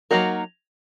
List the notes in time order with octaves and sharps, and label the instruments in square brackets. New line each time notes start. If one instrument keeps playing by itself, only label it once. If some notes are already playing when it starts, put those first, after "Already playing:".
[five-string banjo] F#3 A#3 D#4 F#4 A#4